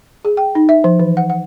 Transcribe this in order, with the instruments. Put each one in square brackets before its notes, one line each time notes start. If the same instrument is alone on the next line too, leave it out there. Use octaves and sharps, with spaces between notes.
[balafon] G#4
G5
D#4
E5
F3
E3
F#5
F#5